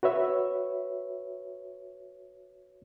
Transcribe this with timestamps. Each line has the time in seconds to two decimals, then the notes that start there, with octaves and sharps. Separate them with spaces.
0.03 F#4 B4 C#5 E5